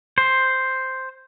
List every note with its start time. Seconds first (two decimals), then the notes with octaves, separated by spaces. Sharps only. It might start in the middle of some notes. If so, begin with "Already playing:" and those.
0.18 C5